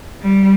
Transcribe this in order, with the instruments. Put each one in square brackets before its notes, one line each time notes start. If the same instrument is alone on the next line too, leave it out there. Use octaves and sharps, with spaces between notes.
[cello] G3